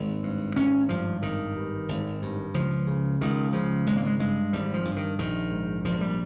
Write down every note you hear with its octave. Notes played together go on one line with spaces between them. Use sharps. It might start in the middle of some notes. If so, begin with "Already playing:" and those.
Already playing: G#1 D#2
G2
G#1 C#4
G2 F3
G#1 D#3
G2
G#1
G2
C#2 F3
C#3
C#2 D#3
C#3 F3
G#1 G#3
A#3
G#3
G2 G#3
G#1 G3
F3
G2
D#3
A#1 D#3
G#2
A#1 F3
G3